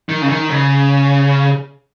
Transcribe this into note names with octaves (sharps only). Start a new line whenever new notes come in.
D#3
C#3
D#3
C#3